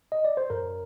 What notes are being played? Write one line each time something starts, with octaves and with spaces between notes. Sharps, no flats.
D#5
D5
C5
F#2 A#4